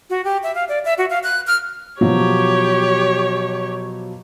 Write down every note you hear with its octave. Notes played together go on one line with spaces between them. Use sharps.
F#4
G4
E5
F5
D5
E5
F#4
F5
F#6
F6
B2 F3 F#3 G4 C#5